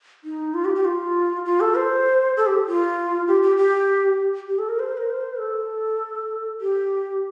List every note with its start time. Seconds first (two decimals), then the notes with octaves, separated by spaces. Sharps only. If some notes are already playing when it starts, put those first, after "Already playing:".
0.24 D#4
0.54 F4
0.65 G4
0.75 G4
0.85 F4
1.45 F4
1.60 A4
1.77 C5
2.37 A4
2.47 G4
2.67 F4
3.28 G4
3.43 G4
3.57 G4
4.48 G4
4.59 A4
4.69 A#4
4.79 C5
4.97 A#4
5.10 C5
5.39 A4
6.61 G4